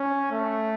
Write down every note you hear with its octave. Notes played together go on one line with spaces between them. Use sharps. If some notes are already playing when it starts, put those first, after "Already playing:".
Already playing: C#4
A3